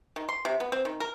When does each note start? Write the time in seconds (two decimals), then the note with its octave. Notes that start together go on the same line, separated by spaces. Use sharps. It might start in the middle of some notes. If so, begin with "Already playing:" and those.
0.16 D#3
0.29 C6
0.45 C3
0.60 B3
0.72 C4
0.85 D#3
1.00 A#4